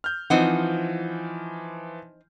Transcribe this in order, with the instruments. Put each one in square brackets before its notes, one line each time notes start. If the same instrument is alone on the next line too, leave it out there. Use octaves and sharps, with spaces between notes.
[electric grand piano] F6 G6
[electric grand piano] E3 F3 [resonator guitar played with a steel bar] C4 D#4 F#5